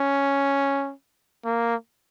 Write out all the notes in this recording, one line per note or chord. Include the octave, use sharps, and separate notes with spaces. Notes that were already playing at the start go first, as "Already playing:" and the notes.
Already playing: C#4
A#3